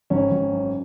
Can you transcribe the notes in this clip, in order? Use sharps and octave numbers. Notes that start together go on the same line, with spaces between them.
G#1 C#4
G#1
F#2